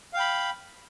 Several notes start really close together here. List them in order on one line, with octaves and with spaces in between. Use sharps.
F5 G5 B5